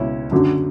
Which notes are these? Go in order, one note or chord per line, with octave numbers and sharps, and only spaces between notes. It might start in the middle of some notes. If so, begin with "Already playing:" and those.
Already playing: C#2 B2 C#4 E4
F#2 D3 F#3